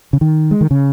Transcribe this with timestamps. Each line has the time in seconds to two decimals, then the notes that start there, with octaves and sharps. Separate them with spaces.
0.13 C#3
0.21 D#3
0.51 G#3
0.61 D#3
0.71 C#3